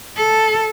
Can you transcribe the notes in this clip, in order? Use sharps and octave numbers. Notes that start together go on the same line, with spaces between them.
A4